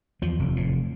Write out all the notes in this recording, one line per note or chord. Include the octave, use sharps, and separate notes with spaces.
E2 F3
F1
A2